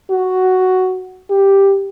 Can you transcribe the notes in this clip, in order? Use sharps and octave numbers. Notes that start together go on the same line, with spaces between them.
F#4
G4